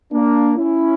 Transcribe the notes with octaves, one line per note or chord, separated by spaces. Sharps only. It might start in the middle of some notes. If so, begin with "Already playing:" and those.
A#3 D4
C#4 E4